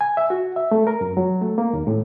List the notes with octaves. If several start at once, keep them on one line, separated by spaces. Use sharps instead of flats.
G#5
E5
F#4
E5
A3
A#4
F#2
F#3
A3
A#3
D#2
A2